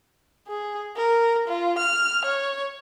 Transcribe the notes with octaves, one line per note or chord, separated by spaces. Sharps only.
G#4
A#4
F4
F6
C#5